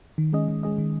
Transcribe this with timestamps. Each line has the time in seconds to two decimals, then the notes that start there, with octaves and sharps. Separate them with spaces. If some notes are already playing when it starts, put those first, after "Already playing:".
0.18 D#3
0.33 G#3 C#4 G#4 D#5
0.48 D#3
0.63 G#3 C#4 G#4 D#5
0.78 D#3